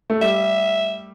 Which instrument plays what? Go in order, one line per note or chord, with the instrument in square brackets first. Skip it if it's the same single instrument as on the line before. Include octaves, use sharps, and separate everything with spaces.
[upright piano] A3
[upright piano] G3 [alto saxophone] E5